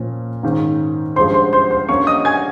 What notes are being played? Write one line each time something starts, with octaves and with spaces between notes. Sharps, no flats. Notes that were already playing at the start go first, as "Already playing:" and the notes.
Already playing: A#2 F3 A#3 C#4
G#2 D#3 A#3 C#4
G2 F3 G#3 C#4 C5 C6
C5 C6
C5 C6
C5 C6
G2 G3 A#3 C#4 C#5 C#6
D#5 D#6
G#5 G#6